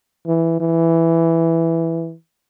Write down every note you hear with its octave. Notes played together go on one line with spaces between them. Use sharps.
E3
E3